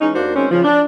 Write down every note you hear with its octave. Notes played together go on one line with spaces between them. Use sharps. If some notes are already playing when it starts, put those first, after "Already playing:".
E3 G#3 C#4 D#4
D#2 A#3 D4 F#4 C5
D#3 G#3 C4 C#4
C#3 F3
D4